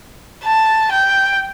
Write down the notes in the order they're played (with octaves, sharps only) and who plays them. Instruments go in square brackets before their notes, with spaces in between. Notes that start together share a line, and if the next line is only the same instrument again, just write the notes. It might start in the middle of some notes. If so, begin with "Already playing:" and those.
[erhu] A5
G5